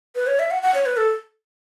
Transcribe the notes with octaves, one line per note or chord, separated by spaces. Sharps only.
B4
C#5
E5
F#5
F#5
C#5
B4
A4